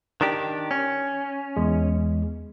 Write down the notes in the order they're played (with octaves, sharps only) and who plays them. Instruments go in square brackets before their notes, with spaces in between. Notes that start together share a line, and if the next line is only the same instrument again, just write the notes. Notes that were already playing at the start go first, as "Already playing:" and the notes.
[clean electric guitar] D#3 D4 G4
C#4
[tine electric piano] E2 G#3